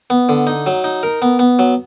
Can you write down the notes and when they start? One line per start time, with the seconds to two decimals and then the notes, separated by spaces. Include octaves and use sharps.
0.10 B3
0.29 D3
0.47 D#4
0.66 F#3
0.84 D#4
1.03 A#4
1.22 B3
1.39 B3
1.59 F#3